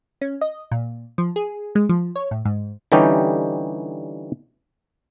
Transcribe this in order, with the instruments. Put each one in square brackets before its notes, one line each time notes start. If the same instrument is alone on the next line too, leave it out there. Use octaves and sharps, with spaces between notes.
[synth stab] C#4
D#5
A#2
F3
G#4
G#3
F3
C#5
A2
G#2
[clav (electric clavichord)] D3 E3 G3 C#4 D#4 G4